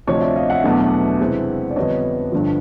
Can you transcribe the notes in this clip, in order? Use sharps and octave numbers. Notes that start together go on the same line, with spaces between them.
D2 C3 F3 C#5 D#5
D5 E5
D#5 F5
E5 F#5
E2 B2 F#3 A3 D4
C3 E3 G#3 C4
D5
F2 D3 G3 B3 D4 C#5 D#5
G2 D3 F3